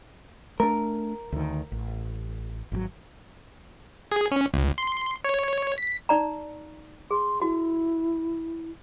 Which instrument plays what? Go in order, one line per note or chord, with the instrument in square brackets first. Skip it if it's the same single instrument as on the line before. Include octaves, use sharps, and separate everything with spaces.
[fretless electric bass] A3 D4 [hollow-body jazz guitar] A#4
[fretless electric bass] D2 D#3
A1
G#1 B2 F#3
[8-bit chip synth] G#4
C#4
C#2
C6
C#5
B6
[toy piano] D#4 D5 A#5
[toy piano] G#4 [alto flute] C6
[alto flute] E4 [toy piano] F#4